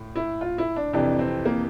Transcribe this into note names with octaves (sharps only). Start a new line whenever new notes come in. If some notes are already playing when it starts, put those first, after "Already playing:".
Already playing: A2
E4
F4
E4
D4
F2 C3 E3 D4
C4
A#3